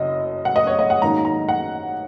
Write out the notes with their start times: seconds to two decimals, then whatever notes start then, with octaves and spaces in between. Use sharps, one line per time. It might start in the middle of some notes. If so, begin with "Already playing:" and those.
Already playing: F#1 F#2 D#5
0.45 F#5
0.56 D#5
0.67 C#5
0.79 D#5
0.90 F#5
1.02 G#2 D#3 F#3 A#3 D#4 A#5
1.25 A#5
1.49 F#5